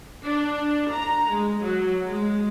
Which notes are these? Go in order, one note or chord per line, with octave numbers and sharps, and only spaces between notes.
D4
A#5
G#3
F#3
G#3